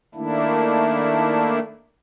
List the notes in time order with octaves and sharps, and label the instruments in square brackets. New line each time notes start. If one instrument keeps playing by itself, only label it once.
[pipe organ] D#3 A3 A#3 D4 E4